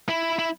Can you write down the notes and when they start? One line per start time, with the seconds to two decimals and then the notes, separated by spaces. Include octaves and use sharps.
0.09 E4
0.39 E4